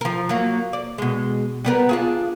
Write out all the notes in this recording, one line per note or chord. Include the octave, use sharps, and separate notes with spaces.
F3 A#4
F#3 A#3
D5
B2 G#3
G3 B3 A#4
D4 F4 G#4